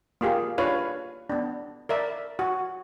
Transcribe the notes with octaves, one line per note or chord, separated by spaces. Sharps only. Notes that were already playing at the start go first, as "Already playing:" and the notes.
A#3 F4 G4 G#4
D4 F4 B4 C#5 F5
B3 D4
A#4 D5 E5
F#4